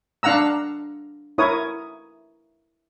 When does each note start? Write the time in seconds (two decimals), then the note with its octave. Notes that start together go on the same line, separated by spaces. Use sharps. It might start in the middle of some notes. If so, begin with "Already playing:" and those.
0.23 D4 F5 F#5 A#5 E6
1.38 E4 A#4 C#5 D#6